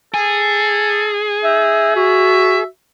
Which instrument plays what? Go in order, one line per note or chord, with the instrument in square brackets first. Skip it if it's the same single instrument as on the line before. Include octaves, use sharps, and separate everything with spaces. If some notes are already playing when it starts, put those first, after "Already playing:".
[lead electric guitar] G#4 [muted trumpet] A4
[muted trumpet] D#4 [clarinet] E5
[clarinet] F#4 [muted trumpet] E5